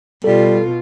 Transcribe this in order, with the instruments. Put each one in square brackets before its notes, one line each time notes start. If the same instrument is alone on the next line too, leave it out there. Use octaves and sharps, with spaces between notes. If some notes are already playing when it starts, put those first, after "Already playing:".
[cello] B2 F4 [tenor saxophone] G3 [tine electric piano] A4